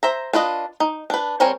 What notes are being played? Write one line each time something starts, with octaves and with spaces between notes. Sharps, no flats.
C5 E5 A#5
D4 F4 B4 D#5
D#4
D4 B4
G3 C4 A#4 C#5 G#5